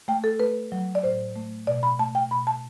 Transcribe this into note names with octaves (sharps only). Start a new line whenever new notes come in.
A3 G5
A4
A3 B4
F#3
D5
A2 C5
A3
B2 D5
B5
A3 A5
G5
B2 B5
A5